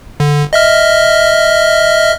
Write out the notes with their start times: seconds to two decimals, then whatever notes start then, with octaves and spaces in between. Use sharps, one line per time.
0.20 D3
0.53 D#5 E5 F6